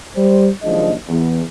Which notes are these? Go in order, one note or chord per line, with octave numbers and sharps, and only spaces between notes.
G3 C5
F#1 D#2 F3 G#3 D4 D#5
E2